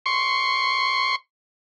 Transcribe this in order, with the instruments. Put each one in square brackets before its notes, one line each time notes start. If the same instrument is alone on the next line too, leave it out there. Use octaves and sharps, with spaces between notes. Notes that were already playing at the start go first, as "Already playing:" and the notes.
[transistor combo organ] C6 C#6